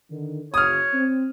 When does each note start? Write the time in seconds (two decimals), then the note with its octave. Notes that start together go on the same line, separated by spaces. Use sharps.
0.11 D3 D#3
0.54 F#1 C#5 D#6 F6
0.93 C4